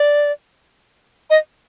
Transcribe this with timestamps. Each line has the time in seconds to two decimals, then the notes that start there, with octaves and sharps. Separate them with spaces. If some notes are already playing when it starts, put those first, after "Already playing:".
Already playing: D5
1.30 D#5